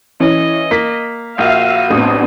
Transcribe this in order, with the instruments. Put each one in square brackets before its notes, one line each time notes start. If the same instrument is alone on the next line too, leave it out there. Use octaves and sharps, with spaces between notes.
[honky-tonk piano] E3 C#4 [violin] D#5
[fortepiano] A#3 [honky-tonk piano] B6
[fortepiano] A#1 F4 [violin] F#4 D#7 [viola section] E5 F5
[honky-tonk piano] A1 D#6 [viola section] B3 C4 D4